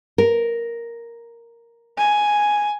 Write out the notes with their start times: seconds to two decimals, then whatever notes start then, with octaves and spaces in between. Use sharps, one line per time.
0.18 A#4
1.98 G#5